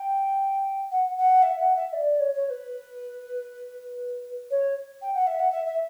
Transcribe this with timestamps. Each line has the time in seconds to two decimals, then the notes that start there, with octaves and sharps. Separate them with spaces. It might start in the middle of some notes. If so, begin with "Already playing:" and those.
Already playing: G5
0.91 F#5
1.17 F#5
1.43 E5
1.60 F#5
1.76 E5
1.93 D5
2.20 C#5
2.35 C#5
2.45 C#5
2.50 B4
4.51 C#5
5.02 G5
5.15 F#5
5.27 E5
5.40 F#5
5.52 E5
5.66 E5